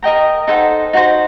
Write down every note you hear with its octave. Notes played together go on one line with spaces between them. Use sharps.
A#4 D#5 G5 A#5
D#4 A4 C5 F#5
D#4 F#4 C5